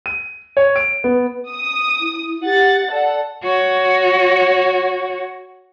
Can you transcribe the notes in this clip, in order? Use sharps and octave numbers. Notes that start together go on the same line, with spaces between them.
D#7
C#5
D7
B3
D#6
E4
G4 F#5 A6
A4 D5 F#5
F#4 C#5